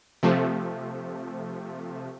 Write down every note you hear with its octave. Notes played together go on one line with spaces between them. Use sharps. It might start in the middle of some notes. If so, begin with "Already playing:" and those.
C3 F3 A3